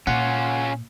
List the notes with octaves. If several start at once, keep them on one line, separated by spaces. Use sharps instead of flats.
A#2 C#4 F4 F#5